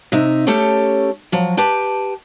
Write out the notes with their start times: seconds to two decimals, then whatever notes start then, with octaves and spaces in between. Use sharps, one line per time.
0.12 C3 D#4 E5
0.47 A3 C#4 G4 A4 C#5
1.32 F3 F#3
1.57 G4 B4 G5 A5